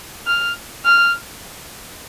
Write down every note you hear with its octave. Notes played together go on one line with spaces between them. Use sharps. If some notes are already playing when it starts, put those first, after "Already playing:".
F6
F6